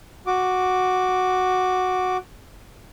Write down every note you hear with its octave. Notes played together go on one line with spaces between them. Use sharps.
F#4 D6